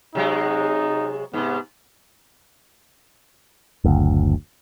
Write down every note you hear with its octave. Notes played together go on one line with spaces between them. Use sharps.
C3 F#3 G#3 D#4
G#2 C3 B3
F#1 D2